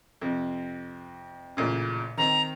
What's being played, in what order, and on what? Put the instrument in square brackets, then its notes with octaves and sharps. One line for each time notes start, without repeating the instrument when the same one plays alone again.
[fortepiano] F2 C3
A1 A#2 C#3
[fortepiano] D#3 C4 [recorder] A#5